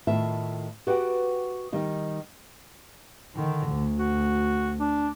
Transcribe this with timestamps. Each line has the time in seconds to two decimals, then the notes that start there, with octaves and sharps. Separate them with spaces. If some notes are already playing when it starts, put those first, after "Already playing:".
0.07 A2 D#3 F4 E5 A5
0.87 F#4 G4 B4 D5 F#5 G5
1.72 D#3 G3 D#4 D#5
3.35 D3 D#3
3.68 D2
3.99 F#4
4.80 D4